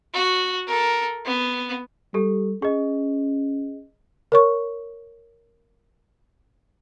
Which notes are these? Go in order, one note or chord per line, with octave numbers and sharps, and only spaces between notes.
F#4
A4 A#4
B3
G3 G4 A4
C#4 G#4 D#5
A#4 C#5 C#6